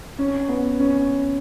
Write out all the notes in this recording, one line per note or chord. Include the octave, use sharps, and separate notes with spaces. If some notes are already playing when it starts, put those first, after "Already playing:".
C#4
B3
C#4